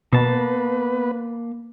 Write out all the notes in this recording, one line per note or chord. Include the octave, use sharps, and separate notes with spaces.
B2 A#3 B3 B4 A5